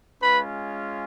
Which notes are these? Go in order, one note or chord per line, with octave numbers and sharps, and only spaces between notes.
G#3 C#4 F4 B4 B5